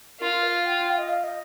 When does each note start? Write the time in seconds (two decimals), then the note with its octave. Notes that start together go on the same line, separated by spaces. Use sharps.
0.20 F4 A#4
0.44 F5
0.66 G5
0.90 F5
0.98 D#5
1.09 F5
1.24 D#5